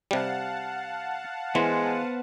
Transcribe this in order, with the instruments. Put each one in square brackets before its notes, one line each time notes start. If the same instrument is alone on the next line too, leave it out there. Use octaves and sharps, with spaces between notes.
[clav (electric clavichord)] C3 G3 [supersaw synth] F5 F#5 A5
[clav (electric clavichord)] E3 [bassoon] G#3 [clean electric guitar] B3 C5